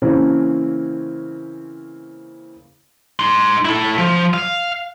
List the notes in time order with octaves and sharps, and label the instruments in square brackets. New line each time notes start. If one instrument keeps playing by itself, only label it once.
[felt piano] C#3 E3 A#3 C4 C#4
[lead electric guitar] D#4 C6
E4 A4
F3
F5